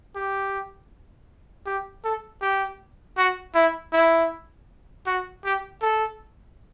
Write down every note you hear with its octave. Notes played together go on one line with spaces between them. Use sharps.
G4
G4
A4
G4
F#4
E4
E4
F#4
G4
A4